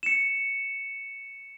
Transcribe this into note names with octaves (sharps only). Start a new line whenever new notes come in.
C#7 E7